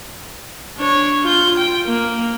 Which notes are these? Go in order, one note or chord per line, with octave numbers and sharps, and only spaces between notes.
D4 C#5
F4 G6
G5
A#3